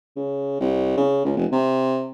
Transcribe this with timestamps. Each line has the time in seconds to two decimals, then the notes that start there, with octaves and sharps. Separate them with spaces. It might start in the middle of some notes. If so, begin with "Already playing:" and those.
0.16 C#3
0.60 C2
0.97 C#3
1.25 C#2
1.37 F1
1.52 C3